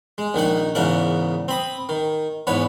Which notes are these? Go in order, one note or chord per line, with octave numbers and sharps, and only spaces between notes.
G#3
A#1 D#3 D#4 F#5
E2 G#2 C#3 A#4 F#5
C4 B5 D#6
D#3
E2 G#2 B4 C#5